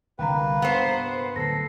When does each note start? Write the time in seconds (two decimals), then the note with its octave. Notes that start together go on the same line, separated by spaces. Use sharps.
0.19 C2 D3 G3 A#3 B4 G5 A#5
0.62 G2 B3 C5
1.36 D1 A4 A#6 C7